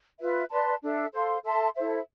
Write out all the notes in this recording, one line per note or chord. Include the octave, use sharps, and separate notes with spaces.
F4 B4 E5
B4 D5 A5 C6
D4 A4 E5
A4 C5 F5 C6
A4 E5 A5 C6
E4 A4 C5 E5